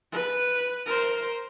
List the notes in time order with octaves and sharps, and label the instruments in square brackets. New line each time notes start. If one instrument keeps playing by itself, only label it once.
[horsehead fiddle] B4
A#4 C5